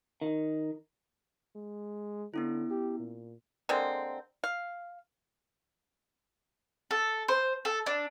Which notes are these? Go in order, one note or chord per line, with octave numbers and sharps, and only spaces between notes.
D#3
G#3
D3 B3 C#4 E4
G4
A#2
D3 G#3 A#3 C4
F5
A4
C5
A4
D4